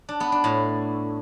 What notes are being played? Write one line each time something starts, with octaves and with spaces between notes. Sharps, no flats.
D4
B3
D4
A2